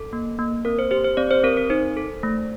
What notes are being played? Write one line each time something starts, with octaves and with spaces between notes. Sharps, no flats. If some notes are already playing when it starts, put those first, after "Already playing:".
Already playing: A4
A#3
A#3
C4 A#4
C5
G4 C5
C5
C4 D5
C5
C4 A#4
A#4
D#4 C5
A4
A3